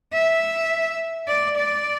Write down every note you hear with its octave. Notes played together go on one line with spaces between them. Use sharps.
E5
D5
D5